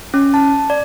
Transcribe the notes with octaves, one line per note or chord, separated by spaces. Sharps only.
C#4
A5
D5